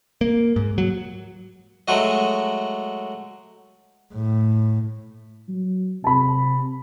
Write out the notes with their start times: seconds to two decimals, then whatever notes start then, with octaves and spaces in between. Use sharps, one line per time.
0.21 A#3
0.56 G#2
0.78 F#3
1.88 F#3 G#3 A3 F#4 D#5
4.13 A2
5.48 F#3
6.04 C3 A5 B5